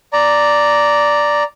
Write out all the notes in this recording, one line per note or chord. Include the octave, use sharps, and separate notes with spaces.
D5 A#5